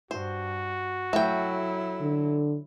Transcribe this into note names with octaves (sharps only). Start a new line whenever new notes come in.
G2 F#4 C5
F#3 A3 E4 G5
D3